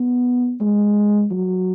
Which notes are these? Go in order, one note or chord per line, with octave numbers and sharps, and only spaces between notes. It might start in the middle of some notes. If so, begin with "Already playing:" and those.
Already playing: B3
G#3
F#3